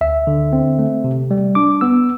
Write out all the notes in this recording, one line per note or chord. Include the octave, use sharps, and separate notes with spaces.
D2 E5
D3
C4
A3
C3
G3
D4 D6
B3 E6